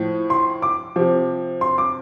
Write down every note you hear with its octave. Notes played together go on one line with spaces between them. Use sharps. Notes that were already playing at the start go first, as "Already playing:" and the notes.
Already playing: A2 F3
C6
D6
C3 F3
C6
D6